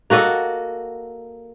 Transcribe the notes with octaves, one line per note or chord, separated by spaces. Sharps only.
A#3 F#4 A4 D#5